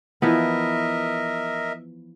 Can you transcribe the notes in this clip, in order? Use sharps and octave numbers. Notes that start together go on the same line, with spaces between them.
E3 F3 B3 A#4 D#5 E5